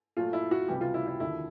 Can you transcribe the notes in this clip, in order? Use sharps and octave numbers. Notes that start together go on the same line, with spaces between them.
A#2 F#3 A3 F4
E4
F#4
C#2 C3 E3 G3 G4
F4
E4
E4
D#2 D3 F3 E4